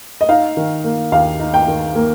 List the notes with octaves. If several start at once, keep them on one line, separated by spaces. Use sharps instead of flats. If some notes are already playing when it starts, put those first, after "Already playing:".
D#5
D#4 F5
D#3
A#3
D#2 F5
D#4
G5
D#3
A#3